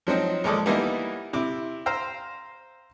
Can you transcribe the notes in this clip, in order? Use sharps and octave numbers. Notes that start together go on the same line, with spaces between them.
F3 F#3 C4 D#4
D#2 F3 G#3 A4 D5 D#5
E3 G3 A#3 B3 D#4 E4
C3 E4 D6
C5 F5 G5 A#5 E6